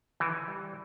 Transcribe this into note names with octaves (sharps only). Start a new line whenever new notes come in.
E3
G3